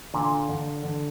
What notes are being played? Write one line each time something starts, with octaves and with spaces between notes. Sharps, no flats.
A#2 D3
D3
D3